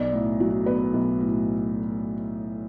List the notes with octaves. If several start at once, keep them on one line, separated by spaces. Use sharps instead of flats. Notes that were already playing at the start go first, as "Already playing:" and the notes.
Already playing: B1 D5
A2
F#3
B3 B4
B1
A2